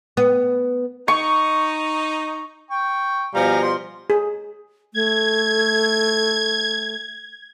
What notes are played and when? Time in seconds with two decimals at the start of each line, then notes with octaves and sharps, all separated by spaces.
0.17 B3
1.08 D#4 C#6
2.70 G5 C#6
3.35 B2 F3 G3 F5 G#5 A#5
3.63 C6
4.10 G#4
4.94 A3 G#6